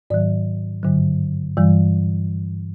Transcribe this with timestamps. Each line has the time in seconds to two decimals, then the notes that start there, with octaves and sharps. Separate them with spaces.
0.10 G#2 D#3 F#3 D5
0.83 G2 D3 F#3
1.57 G2 E3 G3